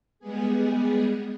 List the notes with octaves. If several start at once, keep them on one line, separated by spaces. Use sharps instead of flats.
G3 G#3 B3 G#4